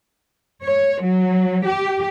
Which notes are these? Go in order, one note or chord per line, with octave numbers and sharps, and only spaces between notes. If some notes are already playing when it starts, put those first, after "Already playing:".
C#5
F#3
G4